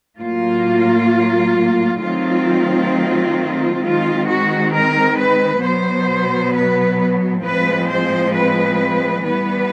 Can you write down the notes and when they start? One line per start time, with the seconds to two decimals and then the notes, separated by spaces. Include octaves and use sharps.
0.21 A2 F#3 A#3 F4
2.02 D#3 F#3 A3 C4 F4
3.83 D#3 G#3 C4 F4
4.28 F#4
4.73 A#4
5.19 B4
5.63 B2 F#3 B3 C5
6.54 B4
7.44 A2 F3 G#3 C4 B4
7.90 C5
8.35 B4
9.25 E3 G3 B3 B4